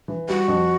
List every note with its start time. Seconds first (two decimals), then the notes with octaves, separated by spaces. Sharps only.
0.08 E3
0.28 G3 F#4
0.48 F2